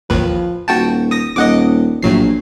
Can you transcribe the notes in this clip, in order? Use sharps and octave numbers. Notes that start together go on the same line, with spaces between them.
A1 D#2 F3 B4
D#1 F#4 G5 A5
D#6 A#6
D#1 D#5 F#5 D6
A#1 A2 F#3 C7